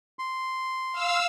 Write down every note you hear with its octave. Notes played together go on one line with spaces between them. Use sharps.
C6
F5 E6